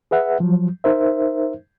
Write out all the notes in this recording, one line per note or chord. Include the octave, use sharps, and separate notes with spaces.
G#4 B4 E5 F#5
F3 F#3
D#4 A#4 C5 E5